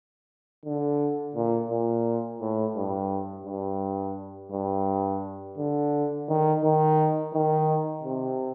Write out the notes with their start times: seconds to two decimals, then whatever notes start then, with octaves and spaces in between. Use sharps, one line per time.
0.65 D3
1.36 A#2
1.71 A#2
2.41 A2
2.76 G2
3.46 G2
4.52 G2
5.58 D3
6.29 D#3
6.64 D#3
7.34 D#3
8.04 C3